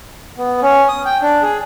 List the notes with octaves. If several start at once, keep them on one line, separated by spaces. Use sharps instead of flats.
B3
C#4
D#6
G5
D4
G#4